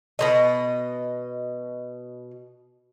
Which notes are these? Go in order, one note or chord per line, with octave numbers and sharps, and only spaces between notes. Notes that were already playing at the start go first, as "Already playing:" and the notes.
B2 F#3 D#5